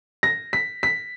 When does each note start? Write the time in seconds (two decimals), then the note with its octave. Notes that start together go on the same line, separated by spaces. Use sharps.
0.23 A#6
0.53 B6
0.83 B6